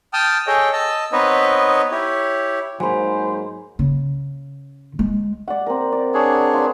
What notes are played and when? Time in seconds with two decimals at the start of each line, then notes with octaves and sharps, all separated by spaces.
0.13 G5 A5 D#6 F6
0.47 G#4 A4 C#5 D#5 G5
0.73 D#5 A5 E6
1.12 B3 C4 D#4 B4 C#5 D#5
1.91 E4 G4 C#5
2.80 G#2 F#3 A#3 C5 G#5 B5
3.79 C#3
4.99 G#3
5.48 D5 F#5
5.66 C4 A#4
5.92 D5
6.14 D4 G#4 C#5
6.54 F4 B4